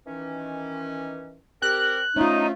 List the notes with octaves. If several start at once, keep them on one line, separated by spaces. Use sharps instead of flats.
D#3 E3 C#4
C4 G4 A#4 F#6
F3 A3 C#4 D#4 F4